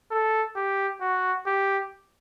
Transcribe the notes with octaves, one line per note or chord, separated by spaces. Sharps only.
A4
G4
F#4
G4